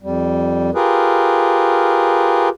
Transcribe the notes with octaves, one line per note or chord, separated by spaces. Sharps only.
F2 G3
F4 G4 G#4 A#4 B4